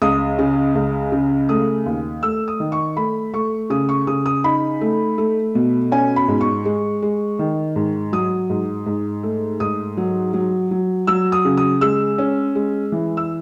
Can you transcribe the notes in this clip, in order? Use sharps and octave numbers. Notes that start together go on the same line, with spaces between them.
C#2 D#6
C#3
C#2
C#3
A3 D#6
D#2
A3 E6
D#6
D#3
C#6
A3 B5
A3 C#6
C#3 D#6
C#6
C#3 D#6
D#6
D#4 B5
A3
A3
B2
C#4 G#5
B5
G#2
C#6
G#3
G#3
D#3
G#2
F#3 D#6
G#2
G#2
A3
G#2 D#6
F#3
F#3
F#3
F#3 E6
D#6
C#3
D#6
G#3 E6
C#4
G#3
E3
E6